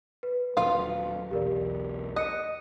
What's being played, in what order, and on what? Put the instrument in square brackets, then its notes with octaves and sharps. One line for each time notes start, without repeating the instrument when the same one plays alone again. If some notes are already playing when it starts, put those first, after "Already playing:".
[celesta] B4
[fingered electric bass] D#1 A#2 F#3 [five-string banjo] F4 F5
[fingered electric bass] B1 E2 [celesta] G4 A#4 D5
[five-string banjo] D#5 [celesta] F#6 C#7